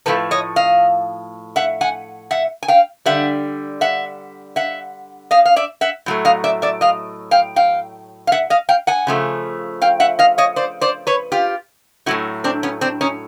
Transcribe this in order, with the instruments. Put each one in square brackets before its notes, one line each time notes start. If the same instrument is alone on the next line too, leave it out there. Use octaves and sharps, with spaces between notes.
[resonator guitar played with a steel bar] A2 F3 A3 A4 B4
C#5 D#5
D#5 F5
E5 F#5
F#5 G#5
E5 F#5
G#5
F5 G5
D3 G3 E5 F#5
E5 F#5
E5 F#5
D#5 F5
F5
D5 E5
E5 F#5
A2 F#3 A3
D#5 F5
D5 E5
D5 E5
D#5 F5
F5 G5
F5 G5
F5
E5 F#5
D#5 F5
F5 G5
F#5 G#5
C#3 F3 A3
F5 G5
E5 F#5
D#5 F5
C#5 D#5
C5 D5
C5 D5
B4 C#5
F4 G4
A2 F#3 A3 E4 F#4
C4 D4
B3 C#4
C4 D4
C#4 D#4